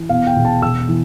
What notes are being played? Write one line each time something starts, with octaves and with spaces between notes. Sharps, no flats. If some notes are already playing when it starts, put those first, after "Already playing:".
Already playing: E3
B2 F5
G5
E1
A5
E1 E6
E3